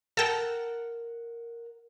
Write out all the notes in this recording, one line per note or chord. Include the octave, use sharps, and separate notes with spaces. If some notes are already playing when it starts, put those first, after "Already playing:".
A4 A#4 F#5 G5 A5 A#5